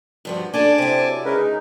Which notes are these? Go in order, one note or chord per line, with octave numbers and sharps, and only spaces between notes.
G2 F3 F#4
D4 G#4 A4 G#5 A5 D6
C3 C4 E4
F#3
G#3 C#4 A#4 B4
D#4